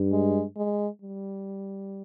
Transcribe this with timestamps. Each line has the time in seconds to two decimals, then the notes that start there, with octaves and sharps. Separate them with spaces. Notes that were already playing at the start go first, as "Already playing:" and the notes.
Already playing: G2
0.11 G#3
0.56 G#3
1.02 G3